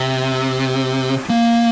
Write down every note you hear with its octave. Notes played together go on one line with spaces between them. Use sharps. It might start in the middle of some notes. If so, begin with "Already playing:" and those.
Already playing: C3
A#3